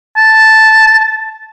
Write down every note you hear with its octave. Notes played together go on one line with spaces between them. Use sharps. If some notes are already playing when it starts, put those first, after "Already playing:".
A5